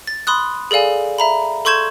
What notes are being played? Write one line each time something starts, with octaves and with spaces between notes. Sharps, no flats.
A6
B5 C6 D#6 F#6
G#4 A4 D5 F5 G#5
E5 A#5 B5
A4 C6 C#6 G6 G#6 E7